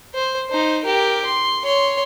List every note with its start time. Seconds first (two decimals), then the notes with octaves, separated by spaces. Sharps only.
0.15 C5
0.49 D#4 C5
0.84 G4 A#4
1.25 C6
1.64 C#5 C6